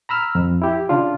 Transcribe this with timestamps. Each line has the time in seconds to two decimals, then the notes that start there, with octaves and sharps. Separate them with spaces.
0.09 A#5 B5 E6 F6
0.35 F2
0.62 E4 G4
0.89 C#3 D4 F4